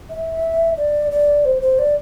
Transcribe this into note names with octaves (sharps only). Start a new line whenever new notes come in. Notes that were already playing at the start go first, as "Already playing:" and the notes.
E5
D5
D5
C5
C5
D5